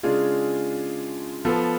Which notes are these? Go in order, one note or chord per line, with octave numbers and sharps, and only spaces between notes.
C#3 G#3 D4 F4 G#4
F3 B3 F4 A4